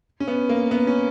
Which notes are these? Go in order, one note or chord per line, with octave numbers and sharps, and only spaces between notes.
C#4
B3
A#3
B3
C#4